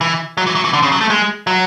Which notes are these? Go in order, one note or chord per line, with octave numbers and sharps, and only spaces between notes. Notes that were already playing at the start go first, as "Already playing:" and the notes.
E3
F#3
E3
F#3
E3
D3
C#3
F#3
A3
G#3
F#3